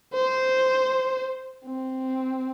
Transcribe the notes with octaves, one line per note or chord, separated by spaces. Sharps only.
C5
C4